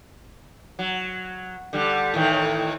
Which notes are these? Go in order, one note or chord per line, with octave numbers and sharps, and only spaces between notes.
F#3
D3 G3
A2 D#3 E3